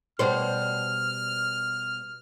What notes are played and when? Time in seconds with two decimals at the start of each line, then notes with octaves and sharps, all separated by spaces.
0.19 B2 G3 C5 F6